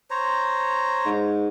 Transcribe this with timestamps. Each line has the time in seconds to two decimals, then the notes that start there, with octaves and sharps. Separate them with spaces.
0.11 C5 C#5 A#5
1.05 G#2